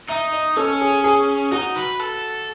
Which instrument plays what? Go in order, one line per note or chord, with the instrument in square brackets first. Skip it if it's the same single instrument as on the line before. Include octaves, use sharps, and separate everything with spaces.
[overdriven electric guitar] D#4 [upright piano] E5
[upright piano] D#5
[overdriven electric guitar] C#4 [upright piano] A4
[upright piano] G#4
G#4
[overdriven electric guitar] D#4 [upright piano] F#4
[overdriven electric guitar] B4
A4